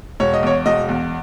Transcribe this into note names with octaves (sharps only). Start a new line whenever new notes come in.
E1 C#5
D#5
E2 C#5
E1 D#5
E2